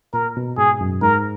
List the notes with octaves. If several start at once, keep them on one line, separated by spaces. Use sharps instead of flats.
A#2 A#4
B2
G#2 G#4
F#2
G#2 A#4